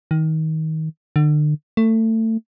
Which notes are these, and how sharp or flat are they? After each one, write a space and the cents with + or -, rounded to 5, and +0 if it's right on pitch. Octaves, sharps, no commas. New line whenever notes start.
D#3 +25
D3 +40
A3 +25